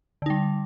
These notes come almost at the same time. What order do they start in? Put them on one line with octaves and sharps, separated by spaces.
D3 D#4 G3